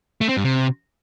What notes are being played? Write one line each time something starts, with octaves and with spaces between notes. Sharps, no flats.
A3
C4
G2
C3